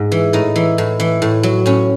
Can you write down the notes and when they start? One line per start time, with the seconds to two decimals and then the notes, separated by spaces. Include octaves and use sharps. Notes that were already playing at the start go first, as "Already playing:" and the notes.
Already playing: G#2
0.12 E3
0.33 A2 D#4
0.56 E3
0.78 A2
1.00 E3
1.22 A2
1.43 F#3
1.66 A2 C#4